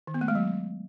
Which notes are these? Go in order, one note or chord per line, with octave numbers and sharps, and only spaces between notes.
D#3
B3
A3
G#3
F#3